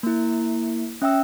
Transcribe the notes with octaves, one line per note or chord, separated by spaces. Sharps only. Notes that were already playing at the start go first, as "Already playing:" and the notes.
A#3 E4
C#4 E5 G5 E6